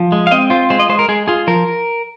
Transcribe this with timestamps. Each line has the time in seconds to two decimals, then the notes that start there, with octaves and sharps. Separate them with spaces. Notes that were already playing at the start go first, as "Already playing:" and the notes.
Already playing: F3
0.12 G#3
0.27 F5
0.31 C4 D#5
0.50 F4 C5
0.70 G#3 C5
0.79 D#5
0.89 G#3 C5
0.99 A#4
1.08 G#3 G#4
1.28 F4 G#4
1.47 F3 A#4